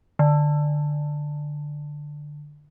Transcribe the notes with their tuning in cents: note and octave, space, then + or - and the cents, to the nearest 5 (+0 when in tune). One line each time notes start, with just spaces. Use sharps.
D3 +10